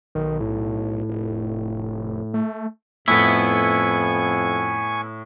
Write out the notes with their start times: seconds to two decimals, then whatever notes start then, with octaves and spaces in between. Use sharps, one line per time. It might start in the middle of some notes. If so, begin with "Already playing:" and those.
0.15 B1 D#3
0.40 A2
1.09 F1
2.34 A3
3.08 F2 A2 B3 E4 G#5 C#6